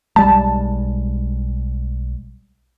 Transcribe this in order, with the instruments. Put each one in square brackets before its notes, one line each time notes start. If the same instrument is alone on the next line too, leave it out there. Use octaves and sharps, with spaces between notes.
[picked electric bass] B1 G3 G#3 [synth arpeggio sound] A5